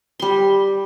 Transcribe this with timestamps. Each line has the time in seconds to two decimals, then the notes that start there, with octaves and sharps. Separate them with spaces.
0.20 G3 C6